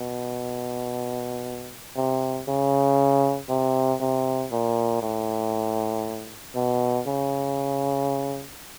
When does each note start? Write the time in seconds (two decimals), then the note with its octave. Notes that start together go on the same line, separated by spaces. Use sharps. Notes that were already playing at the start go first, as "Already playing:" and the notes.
Already playing: B2
1.96 C3
2.48 C#3
3.49 C3
4.00 C3
4.52 A#2
5.02 A2
6.55 B2
7.06 C#3